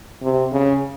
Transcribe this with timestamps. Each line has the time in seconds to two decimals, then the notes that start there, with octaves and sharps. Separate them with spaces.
0.22 C3
0.52 C#3